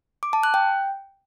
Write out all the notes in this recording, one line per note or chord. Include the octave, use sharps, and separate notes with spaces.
D6
A5
F#6
G5